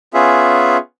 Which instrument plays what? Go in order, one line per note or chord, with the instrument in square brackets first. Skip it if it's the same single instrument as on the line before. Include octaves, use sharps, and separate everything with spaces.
[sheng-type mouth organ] B3 C#4 F4 G#4 E5